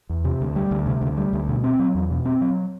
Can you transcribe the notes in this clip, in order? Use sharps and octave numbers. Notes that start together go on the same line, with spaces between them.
E2
C3
D2
G3
D2
C3
D2
G3
D2
B2
C4
F#3
E2
B2
C4
F#3